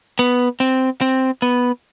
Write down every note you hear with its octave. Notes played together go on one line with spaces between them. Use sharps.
B3
C4
C4
B3